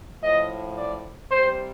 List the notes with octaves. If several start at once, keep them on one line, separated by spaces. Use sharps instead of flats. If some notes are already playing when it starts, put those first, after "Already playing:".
A2 F3 D#5
D5
C3 G3 C5